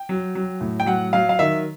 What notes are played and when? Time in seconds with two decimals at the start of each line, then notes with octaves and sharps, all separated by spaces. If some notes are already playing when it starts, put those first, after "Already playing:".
Already playing: G5
0.09 F#3
0.35 F#3
0.61 A2
0.80 G5
0.86 F#3 F#5
1.13 F#3 F5
1.29 F5
1.39 D#3 E5